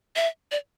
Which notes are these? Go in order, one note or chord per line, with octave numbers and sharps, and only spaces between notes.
E5
D5